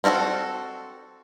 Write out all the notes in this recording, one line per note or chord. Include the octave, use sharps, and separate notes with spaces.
C4 C#4 D#4 F#4 A4